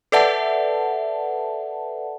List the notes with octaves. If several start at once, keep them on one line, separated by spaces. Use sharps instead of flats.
A4 B4 D5 E5 F#5 A5